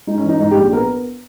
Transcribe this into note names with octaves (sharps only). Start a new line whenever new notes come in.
G#3 D#4
C#4
E3 D#4
G#2 D#4
G4
A#1
B3 A#4